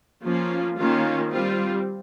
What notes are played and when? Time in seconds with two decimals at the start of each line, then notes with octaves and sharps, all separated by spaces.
0.23 F3 A#3 C#4 F4
0.77 D#3 A#3 C#4 F4
1.31 G3 C4 F4